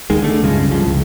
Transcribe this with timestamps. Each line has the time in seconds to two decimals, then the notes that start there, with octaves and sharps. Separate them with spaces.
0.10 D#2 D#3 G#3
0.22 D3 A3
0.42 C#2 G2 C#3 G#3
0.67 C2 F#2 F3
0.87 C#2